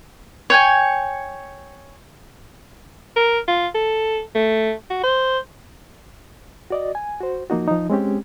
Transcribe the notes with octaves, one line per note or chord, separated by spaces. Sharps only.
C#5 G5 G#5
A#4
F4
A4
A3
F#4
C5
F#4 D5 D#5
G#5
F#4 C5
F3 A#3 D#4 F#4
F3 D#4
G#3 C4 C#4 G4